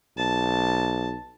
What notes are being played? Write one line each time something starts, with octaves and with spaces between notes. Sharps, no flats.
B1 A5